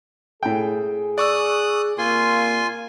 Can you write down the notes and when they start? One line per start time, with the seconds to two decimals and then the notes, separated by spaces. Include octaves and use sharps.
0.43 A2 G#4 G5
1.18 D5 C#6 D#6 E6 F#6
1.98 C3 A#3 F4 G#5 C6